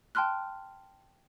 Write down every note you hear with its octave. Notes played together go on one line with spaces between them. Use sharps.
G5 A5 C6 F6 F#6